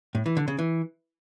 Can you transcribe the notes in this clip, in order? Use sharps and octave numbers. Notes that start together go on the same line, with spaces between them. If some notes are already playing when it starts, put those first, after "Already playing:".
A2
E3
D3
C#3
E3